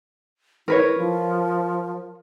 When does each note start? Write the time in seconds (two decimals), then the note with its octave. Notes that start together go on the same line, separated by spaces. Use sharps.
0.68 E4 A#4 B4 C#5
0.98 F3